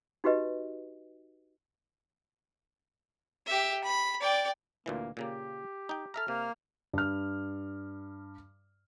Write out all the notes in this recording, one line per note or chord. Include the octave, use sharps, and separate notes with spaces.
D#4 F#4 G4 B4 D#5
G4 E5
B5
D5 G5
D2 A#2 E3 A#3
A#2 C#3 A#3 G4
D#4 G5
A4 E5 A#5 F6
C3 A#3
G2 F6